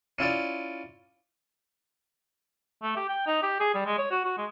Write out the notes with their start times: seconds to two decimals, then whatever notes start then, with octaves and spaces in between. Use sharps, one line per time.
0.19 C#4 E4 F4 D5
2.83 A3
2.97 G4
3.09 G5
3.27 D#4
3.43 G4
3.60 G#4
3.75 G3
3.86 G#3
3.98 C#5
4.11 F#4
4.25 F#4
4.38 G#3